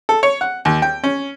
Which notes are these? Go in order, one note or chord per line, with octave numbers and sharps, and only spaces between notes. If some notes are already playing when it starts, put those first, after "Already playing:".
A4
C#5
F#5
D#2
G5
C#4